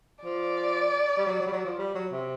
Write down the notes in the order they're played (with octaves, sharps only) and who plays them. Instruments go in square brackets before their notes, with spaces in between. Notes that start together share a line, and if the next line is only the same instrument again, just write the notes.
[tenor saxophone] F3 [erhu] D5
[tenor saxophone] G3
F#3
F#3
G3
F#3
F3
G3
F#3
C3